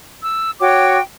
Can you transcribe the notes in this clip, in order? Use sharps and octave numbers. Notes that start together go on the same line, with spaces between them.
E6
F#4 C#5 G5 D6